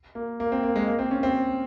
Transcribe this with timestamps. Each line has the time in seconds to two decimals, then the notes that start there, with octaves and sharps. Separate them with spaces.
0.15 A#3
0.40 A#3
0.52 C4
0.63 A#3
0.76 G#3
0.88 A#3
0.99 C4
1.11 C#4
1.23 C4